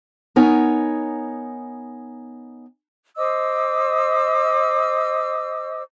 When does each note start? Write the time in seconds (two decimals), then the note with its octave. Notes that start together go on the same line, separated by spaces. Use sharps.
0.36 B3 D#4 A#4 C#5 G#5
3.17 C5 D#5 D6 E6